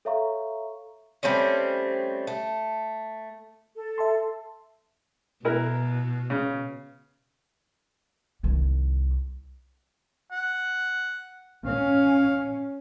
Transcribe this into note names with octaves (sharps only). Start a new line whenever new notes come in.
A4 C#5 E5 F5 A#5 C#6
G3 A3 C4 C#4
A3
A4
E5 A5 C6
B2 E4 A#4 B4
C#3
C2 D#3
F#5
C#4 F5